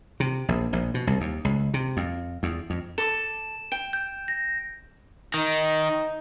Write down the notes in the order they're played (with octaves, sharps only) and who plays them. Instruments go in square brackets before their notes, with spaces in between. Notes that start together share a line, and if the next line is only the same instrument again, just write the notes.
[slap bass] C3
A#1
A#1
B2
C2
D#2
C#2
C3
F2
E2
F2
[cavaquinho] A4 D6 [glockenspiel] E7
[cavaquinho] G5 [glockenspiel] D7
[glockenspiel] G6
A#6
[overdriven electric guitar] D#3 [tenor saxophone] D#4